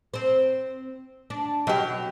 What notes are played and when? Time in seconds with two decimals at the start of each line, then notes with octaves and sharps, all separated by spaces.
0.14 C4 C5
1.30 D4
1.67 B2 F#3 G4